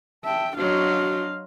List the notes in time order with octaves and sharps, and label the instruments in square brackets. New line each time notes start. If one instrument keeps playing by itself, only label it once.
[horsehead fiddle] E5 G5 [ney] A5
[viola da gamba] F#3 C5 D#5 [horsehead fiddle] D4 F5 [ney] F#4